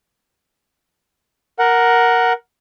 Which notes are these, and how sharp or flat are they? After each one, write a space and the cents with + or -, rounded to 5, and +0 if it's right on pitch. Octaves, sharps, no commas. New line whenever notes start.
A#4 +0 F#5 +0